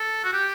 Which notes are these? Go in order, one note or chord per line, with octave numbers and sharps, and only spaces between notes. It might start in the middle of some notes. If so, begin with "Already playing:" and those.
Already playing: A4
F#4
G4